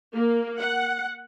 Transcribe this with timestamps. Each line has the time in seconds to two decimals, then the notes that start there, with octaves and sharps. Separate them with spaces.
0.13 A#3
0.59 F#5